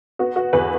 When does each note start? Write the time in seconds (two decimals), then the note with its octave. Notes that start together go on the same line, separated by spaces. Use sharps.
0.19 B3 F#4
0.36 F#4
0.53 E2 B4